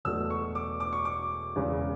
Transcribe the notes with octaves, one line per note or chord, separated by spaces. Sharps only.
E1 E2 B2 F#3 A3 E6
C#6
D6
D6
C#6
D6
E1 E2 C#3